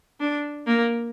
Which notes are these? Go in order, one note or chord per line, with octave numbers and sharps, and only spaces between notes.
D4
A#3